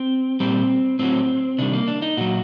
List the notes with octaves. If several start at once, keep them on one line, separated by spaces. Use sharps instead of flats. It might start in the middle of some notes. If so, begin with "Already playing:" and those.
Already playing: C4
A#2 G3 C4
A2 F#3 C4
C3 D#3 G3 D4
A#3
D4
D#4
A#2 F#3 F#4